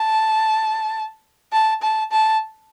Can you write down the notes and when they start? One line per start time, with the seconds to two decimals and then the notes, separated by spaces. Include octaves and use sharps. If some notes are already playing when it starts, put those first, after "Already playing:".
Already playing: A5
1.53 A5
1.82 A5
2.12 A5